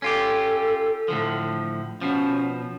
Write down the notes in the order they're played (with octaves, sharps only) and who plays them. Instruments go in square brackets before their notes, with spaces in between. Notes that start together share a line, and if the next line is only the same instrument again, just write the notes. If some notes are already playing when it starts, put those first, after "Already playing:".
[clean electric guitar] C#4 F4 G4 [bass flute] A4
[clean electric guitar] A2 D3 F3
[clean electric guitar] B2 F3 [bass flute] C#4